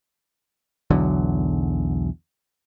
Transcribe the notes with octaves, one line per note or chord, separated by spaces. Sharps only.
B1 E2 D3 F#3